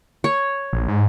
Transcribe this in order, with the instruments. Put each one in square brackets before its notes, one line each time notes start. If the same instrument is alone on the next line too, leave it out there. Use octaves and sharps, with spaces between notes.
[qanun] C#5
[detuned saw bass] A#1
G#2